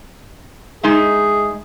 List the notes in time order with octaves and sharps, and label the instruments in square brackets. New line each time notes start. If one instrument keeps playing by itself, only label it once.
[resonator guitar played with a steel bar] G#3 D#4 E5 [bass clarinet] G#4